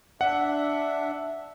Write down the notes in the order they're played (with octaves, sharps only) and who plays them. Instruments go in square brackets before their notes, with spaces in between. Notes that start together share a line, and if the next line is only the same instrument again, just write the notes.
[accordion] D4 E5 [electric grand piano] F#5